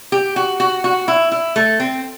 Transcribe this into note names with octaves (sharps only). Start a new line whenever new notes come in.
G4
F#4
F#4
F#4
E4
E4
A3
C4